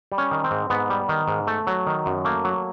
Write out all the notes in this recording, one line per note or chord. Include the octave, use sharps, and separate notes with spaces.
G3
C#4
D#3
C4
G#2
G#2 B3
G3
D#3
G#2
A3
F#3
D#3
F#2
A3 A#3
F#3